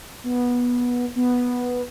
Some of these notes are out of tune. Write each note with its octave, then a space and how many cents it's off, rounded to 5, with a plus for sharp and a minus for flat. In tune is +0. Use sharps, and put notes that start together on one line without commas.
B3 -15
B3 -5